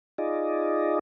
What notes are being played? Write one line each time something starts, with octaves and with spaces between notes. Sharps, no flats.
D#4 F4 G#4 D5 D#5